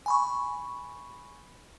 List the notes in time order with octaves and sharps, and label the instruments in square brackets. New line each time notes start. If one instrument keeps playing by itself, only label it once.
[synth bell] G#5 B5 C#6